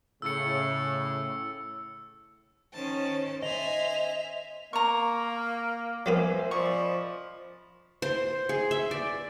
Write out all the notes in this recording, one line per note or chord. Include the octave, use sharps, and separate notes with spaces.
A2 C#3 E6 C#7
D#3 C#4 C5 A5
C5 D#5 E5 G#5 F7
A#3 A#5 C#6
F#3 A#3 B3 C5 E5 G#5
F3 D5 D#5 B5 C#6
C5
G#4
E5
D5